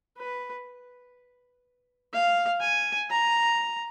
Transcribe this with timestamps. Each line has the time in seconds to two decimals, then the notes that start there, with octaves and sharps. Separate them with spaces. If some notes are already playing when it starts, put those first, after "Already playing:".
0.18 B4
2.14 F5
2.61 G#5
3.11 A#5